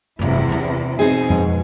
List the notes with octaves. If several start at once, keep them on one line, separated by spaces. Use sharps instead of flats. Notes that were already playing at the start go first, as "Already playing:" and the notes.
F1 E2 G2 C3 E4
B3 D4
B2 C4 D#4 G#4
F2 G#3